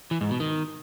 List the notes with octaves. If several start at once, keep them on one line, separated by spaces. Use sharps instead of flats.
E3
G#2
B2
D#3